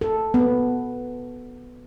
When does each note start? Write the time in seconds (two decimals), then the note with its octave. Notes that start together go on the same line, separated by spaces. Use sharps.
0.01 A4
0.34 B3